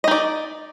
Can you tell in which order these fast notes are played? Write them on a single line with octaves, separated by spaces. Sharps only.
D#5 D#4 D5